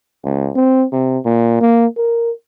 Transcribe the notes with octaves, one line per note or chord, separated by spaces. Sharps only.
C#2
C4
C3
A#2
A#3
A#4